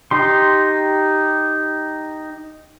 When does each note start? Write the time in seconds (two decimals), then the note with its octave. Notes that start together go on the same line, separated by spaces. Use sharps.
0.11 D#4 G4 C6